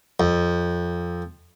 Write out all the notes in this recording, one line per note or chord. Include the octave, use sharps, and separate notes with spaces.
F2